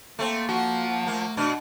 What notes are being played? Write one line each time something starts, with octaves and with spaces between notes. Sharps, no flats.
A3 A#3 C4
F3 F#4
A3 A#3
B2 D4